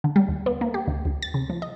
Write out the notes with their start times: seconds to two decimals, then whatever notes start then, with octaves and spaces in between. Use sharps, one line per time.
0.04 D3
0.16 G3
0.28 D#2
0.46 B3
0.61 A#3
0.74 G4
0.88 D2
1.05 D2
1.22 A6
1.34 C#3
1.49 F3
1.62 D#5